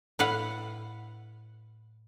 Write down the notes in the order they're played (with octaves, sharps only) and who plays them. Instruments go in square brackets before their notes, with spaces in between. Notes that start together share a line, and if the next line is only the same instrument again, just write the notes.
[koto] A2 B4 F5 F#5